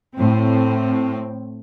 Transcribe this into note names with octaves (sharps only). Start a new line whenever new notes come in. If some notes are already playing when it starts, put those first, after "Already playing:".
A2 C4